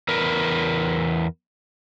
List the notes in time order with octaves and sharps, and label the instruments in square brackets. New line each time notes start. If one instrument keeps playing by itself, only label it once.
[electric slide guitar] E2 A#4 B4